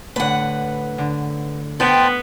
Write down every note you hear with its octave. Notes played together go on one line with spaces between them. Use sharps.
A2 D3 B4 F#5
D3
G2 B3 C5 G5 A5 C6 C#6